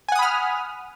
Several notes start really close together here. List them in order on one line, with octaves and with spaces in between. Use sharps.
G#5 F#5 D#6 B5 F6